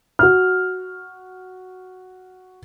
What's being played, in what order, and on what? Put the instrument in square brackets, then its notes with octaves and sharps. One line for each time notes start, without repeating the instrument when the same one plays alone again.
[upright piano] F#4 F6